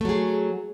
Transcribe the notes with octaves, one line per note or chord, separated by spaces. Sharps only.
F#3 A3 G#4